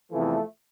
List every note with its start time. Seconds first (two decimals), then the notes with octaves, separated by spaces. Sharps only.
0.11 E2 C3 E3 F3 A3